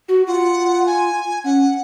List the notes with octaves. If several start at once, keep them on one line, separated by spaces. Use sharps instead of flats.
F#4
F4 F#5
G#5
C#4 F#5